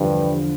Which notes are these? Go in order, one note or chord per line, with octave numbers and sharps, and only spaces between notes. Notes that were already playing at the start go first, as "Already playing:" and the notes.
Already playing: E2 G2 D3 F3 D4